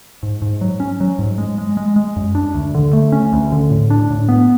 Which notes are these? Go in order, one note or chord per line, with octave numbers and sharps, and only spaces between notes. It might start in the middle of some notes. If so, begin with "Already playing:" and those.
G#2
G#2
F#3
C#4
F#3
G#2
G#3
G#3
G#3
G#3
F#2
D4
D2
D3
A3
C#4
D2
D3
A2
D4
A2
B3